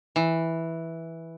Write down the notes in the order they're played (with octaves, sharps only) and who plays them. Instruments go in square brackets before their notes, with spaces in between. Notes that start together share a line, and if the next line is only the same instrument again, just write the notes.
[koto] E3